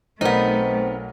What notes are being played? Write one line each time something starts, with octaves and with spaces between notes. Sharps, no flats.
B1 A3 B3 C4 D#4 A#4